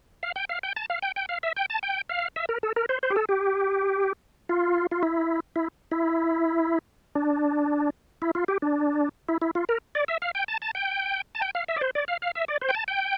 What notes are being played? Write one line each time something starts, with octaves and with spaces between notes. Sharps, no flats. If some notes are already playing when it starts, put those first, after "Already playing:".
F5
G5
F5
G5
A5
F5
G5
G5
F5
E5
G5
A5
G5
F5
E5
A#4
A4
A#4
C5
C5
G4
A4
G4
F4
F4
E4
E4
E4
D4
E4
F4
G4
D4
E4
E4
F4
A#4
D5
E5
F5
G5
A5
A5
G5
A5
G5
F5
E5
D5
C5
D5
F5
F5
E5
D5
C5
G5
A5
G5